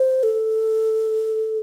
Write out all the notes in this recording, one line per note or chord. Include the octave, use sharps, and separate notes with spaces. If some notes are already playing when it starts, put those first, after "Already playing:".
Already playing: C5
A4